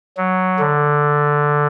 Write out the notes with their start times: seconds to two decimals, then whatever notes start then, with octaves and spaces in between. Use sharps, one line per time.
0.17 F#3
0.59 D3